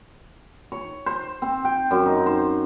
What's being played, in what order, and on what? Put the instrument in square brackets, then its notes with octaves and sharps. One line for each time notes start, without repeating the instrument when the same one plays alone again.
[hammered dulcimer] C#5
C5
C4
G5
F#2
D#4
C5